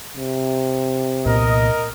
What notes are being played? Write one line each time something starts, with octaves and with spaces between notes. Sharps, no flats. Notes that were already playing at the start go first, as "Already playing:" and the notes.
C3
C2 A#2 B3 A#4 D#5